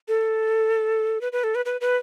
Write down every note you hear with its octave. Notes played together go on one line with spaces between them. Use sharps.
A4
B4
B4
A4
B4
B4
B4